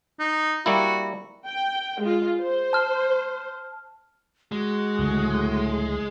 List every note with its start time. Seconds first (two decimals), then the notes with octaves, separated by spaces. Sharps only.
0.20 D#4
0.66 G3 A#3 E4 F#4
1.46 G5
2.01 G#3 F4
2.38 C5
2.73 A5 F6
4.52 G#3 F#4
4.99 C#2 A2 D3 F#3